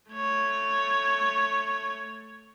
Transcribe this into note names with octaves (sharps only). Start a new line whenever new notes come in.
A3 C#5